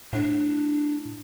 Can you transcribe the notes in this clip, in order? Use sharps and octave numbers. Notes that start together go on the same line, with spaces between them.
A2 D4